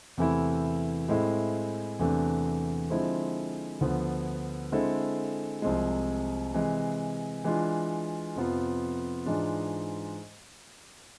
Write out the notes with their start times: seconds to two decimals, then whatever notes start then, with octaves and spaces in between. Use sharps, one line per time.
0.17 E2 C3 E3 A3 E4
1.09 A2 G#3 C4 E4
1.99 E2 C3 E3 A3 D4
2.90 D3 F3 G#3 C4 E4
3.81 D2 D3 F3 B3
4.72 D3 G#3 C4 E4 A4
5.62 C2 C3 F3 G#3
6.54 C3 E3 G#3
7.44 E3 G#3 D4 F4
8.35 F2 C3 F3 B3 F4
9.26 G#2 E3 G#3 D4 F4